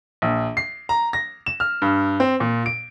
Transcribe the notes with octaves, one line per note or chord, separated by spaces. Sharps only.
A#1
C7
A#5
A#6
E7
F6
G2
C4
A#2
D7